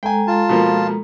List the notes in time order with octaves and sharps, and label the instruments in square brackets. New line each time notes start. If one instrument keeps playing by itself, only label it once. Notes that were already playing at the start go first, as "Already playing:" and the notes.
[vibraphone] G#3 A4 A#5 [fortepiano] G5 G#5
[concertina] F4 A5
[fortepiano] B2 F3 A#3